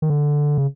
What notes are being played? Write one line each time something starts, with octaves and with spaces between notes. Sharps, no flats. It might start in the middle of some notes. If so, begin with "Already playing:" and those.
D#3
D3
C#3